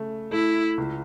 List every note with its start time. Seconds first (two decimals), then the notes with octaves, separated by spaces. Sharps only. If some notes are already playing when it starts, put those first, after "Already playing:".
Already playing: C#3 A3
0.32 A3 E4
0.78 C#2